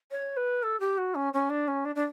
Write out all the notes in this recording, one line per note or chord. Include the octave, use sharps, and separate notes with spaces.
C#5
B4
A4
G4
F#4
C#4
C#4
D4
C#4
D4
D4